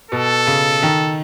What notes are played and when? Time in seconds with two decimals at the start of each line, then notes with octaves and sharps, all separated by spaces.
0.11 B2 A4
0.47 C#3
0.83 D#3